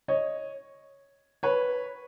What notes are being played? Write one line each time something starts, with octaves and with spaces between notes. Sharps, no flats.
C#5 D#5
B4 C#5